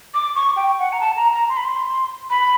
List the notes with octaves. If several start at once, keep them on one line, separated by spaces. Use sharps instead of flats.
D6
C#6
G5
F#5
A#5
A5
A#5
A#5
C6
B5
C6
B5